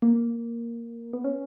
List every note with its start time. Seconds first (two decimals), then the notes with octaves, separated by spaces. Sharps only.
0.02 A#3
1.13 B3
1.24 C#4